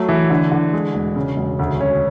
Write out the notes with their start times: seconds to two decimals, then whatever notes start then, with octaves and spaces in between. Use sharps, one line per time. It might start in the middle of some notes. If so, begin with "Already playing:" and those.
Already playing: F#3 A3
0.09 E3
0.30 D3
0.52 D3
0.73 G#3
0.95 E1
1.16 C#3
1.37 E1
1.59 D2
1.81 C#4